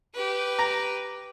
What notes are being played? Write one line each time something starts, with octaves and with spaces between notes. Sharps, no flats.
G4 B4
A#5